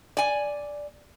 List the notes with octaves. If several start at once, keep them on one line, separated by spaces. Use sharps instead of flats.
D5 G#5